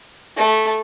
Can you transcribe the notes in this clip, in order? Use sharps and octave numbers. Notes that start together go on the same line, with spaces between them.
A3